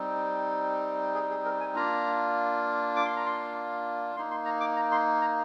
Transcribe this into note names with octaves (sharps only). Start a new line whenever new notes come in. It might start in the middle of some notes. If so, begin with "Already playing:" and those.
Already playing: G3 C4 D#4
G#4
G#4
A#4
G#5
A#3 D4 F4 A#5
D6
C6
A#5
C6
A#3 D#4 C6
C6
A#5
D6
A#5
C6
A#5